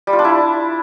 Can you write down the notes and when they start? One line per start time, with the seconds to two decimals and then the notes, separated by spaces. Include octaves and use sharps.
0.07 G3
0.13 F4
0.19 D4
0.25 E4